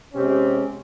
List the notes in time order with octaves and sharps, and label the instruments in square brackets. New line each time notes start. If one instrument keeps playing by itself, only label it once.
[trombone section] C3 G#3 C4 C#4 G4